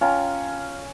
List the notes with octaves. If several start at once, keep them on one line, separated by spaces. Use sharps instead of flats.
C#4 F4 G5 A#5